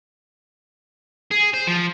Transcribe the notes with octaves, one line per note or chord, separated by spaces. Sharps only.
G#4
C5
F3